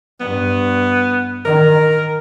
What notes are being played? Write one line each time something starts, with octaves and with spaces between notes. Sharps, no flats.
G2 B3
D#3 A#4